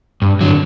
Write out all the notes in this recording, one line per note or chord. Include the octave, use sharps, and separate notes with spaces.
G2
D3 F#3